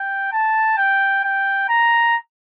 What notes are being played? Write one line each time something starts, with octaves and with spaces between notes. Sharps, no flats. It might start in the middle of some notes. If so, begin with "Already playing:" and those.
Already playing: G5
A5
G5
G5
A#5